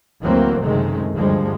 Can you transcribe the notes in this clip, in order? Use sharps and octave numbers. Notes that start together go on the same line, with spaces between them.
D2 E3 F#3 A3 A#3 C4
F#1 F#2 C3 D#3 G#3 A3
D2 G2 F3 G3 G#3